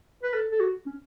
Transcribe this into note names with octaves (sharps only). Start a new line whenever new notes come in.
B4
A4
A4
F#4
C#4